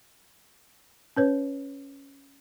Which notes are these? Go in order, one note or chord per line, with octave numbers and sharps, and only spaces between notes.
C#4 B4 C#5